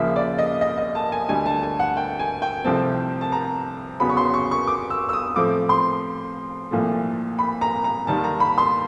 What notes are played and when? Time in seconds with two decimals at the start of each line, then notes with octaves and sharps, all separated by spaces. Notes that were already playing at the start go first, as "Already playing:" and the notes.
Already playing: D#2 C#3 F3 A#3 E5
0.16 D5
0.38 D#5
0.61 D#5
0.78 D#5
0.95 A5
1.12 G#5
1.29 D2 D3 G3 G#5
1.46 A5
1.63 G#5
1.80 F#5
1.97 G5
2.19 G#5
2.42 G5
2.64 C2 C3 F3 A3 C4 A5
3.21 A5
3.32 A#5
4.00 E2 C#3 F#3 B3 B5
4.09 C#6
4.17 C6
4.34 C#6
4.51 C#6
4.67 D6
4.90 E6
5.09 E6
5.13 D#6
5.36 A2 F3 A3 C4 D6
5.69 C6
6.71 C2 A#2 F3 A3
7.39 B5
7.61 A#5
7.84 A#5
8.06 D#2 D#3 G3 A5
8.24 A#5
8.40 B5
8.58 C6